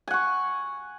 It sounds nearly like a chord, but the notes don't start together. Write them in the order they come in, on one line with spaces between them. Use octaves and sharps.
G#5 F#5 C#6